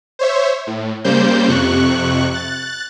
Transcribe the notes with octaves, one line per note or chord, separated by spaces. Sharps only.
C5 C#5 E5
A2
C#3 G3 A#3 C5 G6
F2 C3 C#6 F#6
F#6 A6